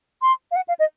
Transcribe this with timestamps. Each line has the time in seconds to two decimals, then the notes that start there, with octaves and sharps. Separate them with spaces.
0.22 C6
0.51 F5
0.56 F#5
0.68 F5
0.79 D#5